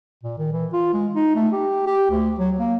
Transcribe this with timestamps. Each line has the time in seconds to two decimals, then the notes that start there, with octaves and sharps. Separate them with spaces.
0.23 A#2
0.38 D#3
0.53 E3
0.73 F4
0.93 G#3
1.14 D#4
1.36 A3
1.52 G4
1.86 G4
2.10 D2
2.39 F#3
2.59 A#3